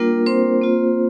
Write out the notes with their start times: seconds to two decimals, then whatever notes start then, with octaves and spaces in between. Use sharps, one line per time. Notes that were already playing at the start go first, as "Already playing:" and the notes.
Already playing: G3 A#3 D4 F4 A#4
0.26 C4 C5
0.61 A#3 F4